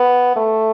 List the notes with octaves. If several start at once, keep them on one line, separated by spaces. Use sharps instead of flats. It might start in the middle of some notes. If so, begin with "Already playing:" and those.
Already playing: B3
A3